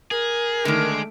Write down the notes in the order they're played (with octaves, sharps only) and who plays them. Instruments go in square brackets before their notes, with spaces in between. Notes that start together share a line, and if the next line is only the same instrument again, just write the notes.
[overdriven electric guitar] G#4 [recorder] A#4
[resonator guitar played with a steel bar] D3 D#3 [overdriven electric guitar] G#3 [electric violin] A3 D7